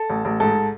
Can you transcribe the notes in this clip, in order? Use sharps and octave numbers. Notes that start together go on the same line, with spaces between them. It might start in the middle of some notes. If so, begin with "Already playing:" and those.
Already playing: A4
A1
A1
G#2 A4